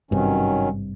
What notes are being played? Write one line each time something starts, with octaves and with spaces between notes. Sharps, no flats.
G#1 G2 C3 D#3 F#3 C#4